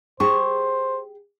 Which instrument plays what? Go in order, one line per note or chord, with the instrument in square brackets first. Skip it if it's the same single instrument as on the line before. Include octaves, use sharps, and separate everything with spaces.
[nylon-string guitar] G4 G#4 [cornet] C5 [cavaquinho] C#6